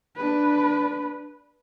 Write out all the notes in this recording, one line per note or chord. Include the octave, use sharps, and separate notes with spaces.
D4 B4